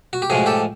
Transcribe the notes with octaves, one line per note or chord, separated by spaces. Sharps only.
F#4
G4
A2 F3 G#3 F#4 G#4
G4 A4